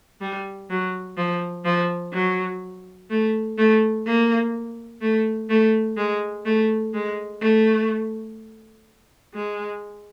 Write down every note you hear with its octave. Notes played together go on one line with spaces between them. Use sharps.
G3
F#3
F3
F3
F#3
A3
A3
A#3
A3
A3
G#3
A3
G#3
A3
G#3